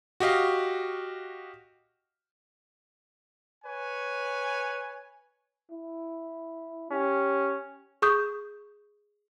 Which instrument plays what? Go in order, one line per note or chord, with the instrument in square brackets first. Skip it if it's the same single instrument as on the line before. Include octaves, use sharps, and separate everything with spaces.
[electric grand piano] F#4 G4 D#5 F5
[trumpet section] B4 C#5 G#5
[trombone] E4
[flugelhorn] C#4 [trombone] G4
[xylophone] G#4 C#6 D#6 G6